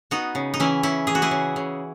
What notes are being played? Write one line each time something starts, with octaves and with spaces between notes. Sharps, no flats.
B3 D#4 F#4
C#3
D#4
E3 C#4 E4
C#3 C#4 E4
E3 G#4
F#4
E4 G#4
C#3
C#3